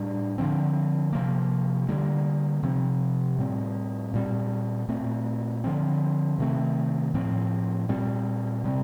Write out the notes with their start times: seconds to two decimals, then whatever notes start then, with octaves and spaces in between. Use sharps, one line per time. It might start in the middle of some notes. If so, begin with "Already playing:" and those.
Already playing: A2 G3 D4
0.38 D3 F3 C4
1.12 C3 F3 A#3
1.88 D3 G3 A#3
2.63 C3 F3 C4
3.38 A2 G3 C4
4.14 A#2 G3 C4
4.88 A#2 A3 C4
5.64 D3 F3 C4
6.38 C3 D#3 A3 C4
7.14 A2 F3 C4
7.89 A#2 G3 C4
8.64 C3 G3 C4